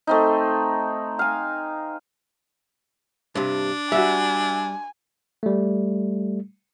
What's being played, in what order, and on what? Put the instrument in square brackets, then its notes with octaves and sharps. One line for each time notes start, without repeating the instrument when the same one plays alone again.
[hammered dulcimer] A3 C4 D#4
F5 G#5
[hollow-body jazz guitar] G2 C3 [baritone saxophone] D4
[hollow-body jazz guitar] G3 [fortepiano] F#4 E5 [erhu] G#5
[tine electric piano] G3 A3